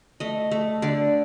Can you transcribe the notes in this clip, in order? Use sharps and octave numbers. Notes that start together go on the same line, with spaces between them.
A3 D#5
A3
D3 D5